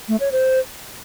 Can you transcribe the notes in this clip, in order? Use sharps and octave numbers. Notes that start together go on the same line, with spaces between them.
A3
C#5
C5